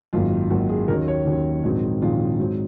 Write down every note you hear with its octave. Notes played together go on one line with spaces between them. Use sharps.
G#1 F#2 D#3 A#3 F4
G#1 F#2 D#3 A#3 F#4
G#4
D#2 D#3 F#3 C#4 A#4
C#5
D#2 D#3 F#3 C#4
A#1 G#2 D#3 F#3 C4
A#1 G#2 D#3 F#3 C4 F4
G#2 F#3 C4